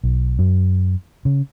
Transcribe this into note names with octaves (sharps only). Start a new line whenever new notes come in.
B1
F#2
C#3